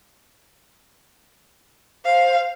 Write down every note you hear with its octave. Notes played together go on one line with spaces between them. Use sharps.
C5 F5